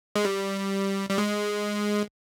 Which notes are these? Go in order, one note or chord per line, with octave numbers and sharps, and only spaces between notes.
G#3
G3
G3
G#3